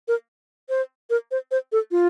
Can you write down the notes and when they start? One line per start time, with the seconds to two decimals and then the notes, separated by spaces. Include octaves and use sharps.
0.08 A#4
0.69 C5
1.10 A#4
1.31 C5
1.51 C5
1.72 A4
1.91 F4